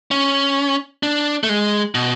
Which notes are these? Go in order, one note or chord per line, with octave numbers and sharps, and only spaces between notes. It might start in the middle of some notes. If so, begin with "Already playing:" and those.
C#4
D4
A3
G#3
B2